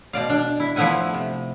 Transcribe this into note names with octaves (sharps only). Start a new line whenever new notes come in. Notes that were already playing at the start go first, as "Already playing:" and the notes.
B2 D5 F5
D4
E4
F3 A3 B3 E4 F#5 G#5
C3